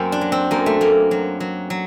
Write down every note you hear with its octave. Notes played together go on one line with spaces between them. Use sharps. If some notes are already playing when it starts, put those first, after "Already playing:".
Already playing: F#2 A#3 C4
D4
F#3
C4
F#2 A#3
A3
F#2 A#3
F#3
F#3
F#3